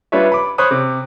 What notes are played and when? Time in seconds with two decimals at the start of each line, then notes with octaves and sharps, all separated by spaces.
0.12 G3 D4 F4 B4 C#5 E5
0.32 B5 D6
0.58 C5 C#5 B5 D#6 F#6
0.71 C3